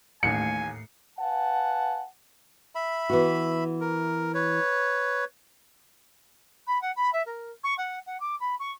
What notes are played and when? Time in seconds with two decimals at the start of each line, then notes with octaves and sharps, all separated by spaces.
0.23 A1 D#2 A2 A3 G#5 C7 C#7
1.19 B4 F5 F#5 G#5 A5
2.75 E5 B5
3.10 E3 B3 F#4
3.81 A#4
4.34 B4 C#5
6.67 B5
6.81 F#5
6.96 B5
7.13 E5
7.26 A#4
7.63 C#6
7.77 F#5
8.06 F#5
8.20 D6
8.40 B5
8.59 C#6